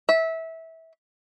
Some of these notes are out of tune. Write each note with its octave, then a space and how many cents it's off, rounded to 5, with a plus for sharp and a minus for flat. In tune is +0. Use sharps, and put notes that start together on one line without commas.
E5 -20